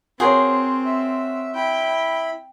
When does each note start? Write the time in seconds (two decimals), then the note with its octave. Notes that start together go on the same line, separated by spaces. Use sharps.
0.20 C4 F#4 G#4 A#4 C5 C#5
0.85 E5
1.55 E4 G5 B5